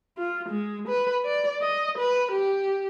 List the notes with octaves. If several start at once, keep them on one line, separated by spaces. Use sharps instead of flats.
F4
G#3
B4
D5
D#5
B4
G4